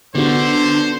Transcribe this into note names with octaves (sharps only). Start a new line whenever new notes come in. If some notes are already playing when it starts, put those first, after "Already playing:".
D3 B3 D4 F#4 C5